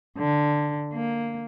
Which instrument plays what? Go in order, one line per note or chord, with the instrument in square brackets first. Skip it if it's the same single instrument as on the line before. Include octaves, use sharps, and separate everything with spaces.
[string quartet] D3
A#3